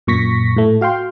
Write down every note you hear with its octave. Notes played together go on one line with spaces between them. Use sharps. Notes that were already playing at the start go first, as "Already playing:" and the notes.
F#2 A#2 C#6 A#6 B6
A2 A3
F#4 F5 G5 C6